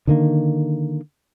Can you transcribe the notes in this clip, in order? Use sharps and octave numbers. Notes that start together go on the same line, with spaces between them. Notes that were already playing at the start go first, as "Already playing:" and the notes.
D3 D#3 A#3